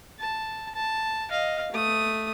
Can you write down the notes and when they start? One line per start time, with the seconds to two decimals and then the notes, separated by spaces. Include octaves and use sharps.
0.20 A5
0.75 A5
1.30 D#5 F5
1.72 A3 D#6